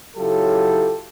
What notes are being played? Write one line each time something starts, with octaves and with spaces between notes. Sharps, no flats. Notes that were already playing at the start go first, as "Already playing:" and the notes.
C#3 F#3 E4 F4 G4 A4